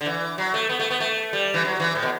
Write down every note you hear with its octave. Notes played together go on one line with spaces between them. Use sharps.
D3
E3
F#3
A3
B3
A3
B3
A3
G3
E3
F#3
E3
A2
B2